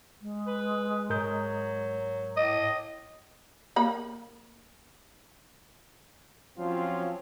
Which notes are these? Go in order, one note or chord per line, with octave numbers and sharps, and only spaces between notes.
G#3
B4
G#2 F#3 A#4 G6
A2 D#5
A#3 B5
F3 F#3 C4 C#4 F4